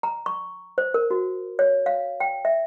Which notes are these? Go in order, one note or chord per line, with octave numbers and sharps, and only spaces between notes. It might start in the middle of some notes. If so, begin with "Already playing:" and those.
A#5
C#6
C5
A#4
F#4
C#5
F5
G5
E5